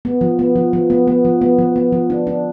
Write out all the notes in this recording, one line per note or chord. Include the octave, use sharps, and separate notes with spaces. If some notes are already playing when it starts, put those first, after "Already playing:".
B3
F3
B3
F3
F3
B3
B3
F3
B3
F3
B3
F3
D4
D4